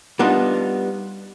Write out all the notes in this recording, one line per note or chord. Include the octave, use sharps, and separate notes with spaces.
G3 B3 D4 D#4 F4